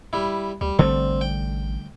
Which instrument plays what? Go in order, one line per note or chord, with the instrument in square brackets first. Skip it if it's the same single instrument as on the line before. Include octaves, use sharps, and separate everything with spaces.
[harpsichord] G3 E4
[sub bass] D2 [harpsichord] G3
[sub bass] A1 [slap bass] D3 G3 A3 [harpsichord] C4
[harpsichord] G5